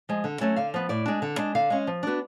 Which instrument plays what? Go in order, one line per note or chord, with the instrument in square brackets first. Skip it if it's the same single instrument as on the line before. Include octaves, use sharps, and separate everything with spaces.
[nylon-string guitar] F3 G#3
D3
F#3 A3 C#4
D3 F5
F3 B3
A2 D5
G#3 D4
D3
G#3 D4
D3 F5
G#3 C#4
F3
B3 D4 F#4